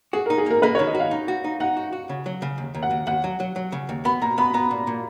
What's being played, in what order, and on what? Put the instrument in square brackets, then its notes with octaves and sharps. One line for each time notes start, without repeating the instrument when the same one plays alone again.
[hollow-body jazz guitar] F#4 [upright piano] G#4
[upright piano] A#4
[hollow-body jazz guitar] D#4
[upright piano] G#4
[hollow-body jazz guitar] A#3 [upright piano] A#4
[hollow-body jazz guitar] A#3 [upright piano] B4
[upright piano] C#5
[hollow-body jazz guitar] D#3
[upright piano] D#5
[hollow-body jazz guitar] F#4
[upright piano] F5
[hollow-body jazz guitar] D#4
F#4
D#4
[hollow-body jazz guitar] D#4 [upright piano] F#5
[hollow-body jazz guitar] F#4
F#4
C#3
F#3
C#3
D#2
D#2
[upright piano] F#5
[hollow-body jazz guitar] D#2
[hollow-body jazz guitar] D#2 [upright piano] F#5
[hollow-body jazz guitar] F#3
F#3
F#3
C#3
D#2
[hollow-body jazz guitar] B3 [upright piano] B5
[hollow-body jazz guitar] A#2 [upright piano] A#5
[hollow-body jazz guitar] B3 [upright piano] B5
[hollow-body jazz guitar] B3 [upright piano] A#5
[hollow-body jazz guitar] A#2
A#2